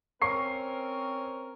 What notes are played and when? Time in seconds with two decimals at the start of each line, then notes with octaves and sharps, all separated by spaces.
0.22 C4 C#4 A#4 C#6 C7